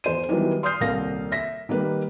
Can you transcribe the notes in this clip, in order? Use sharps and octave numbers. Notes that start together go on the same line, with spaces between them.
E2 C5 D#7
D#3 E3 F#3 G3 B3
C6 D#6 F6 G6 C7
D#1 C2 A#3 F5 A#6
E5 A#6 B6
D#3 G3 A#3 B4